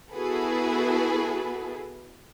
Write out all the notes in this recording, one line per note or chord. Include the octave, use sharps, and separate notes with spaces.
B3 E4 F#4 G#4 A4 B4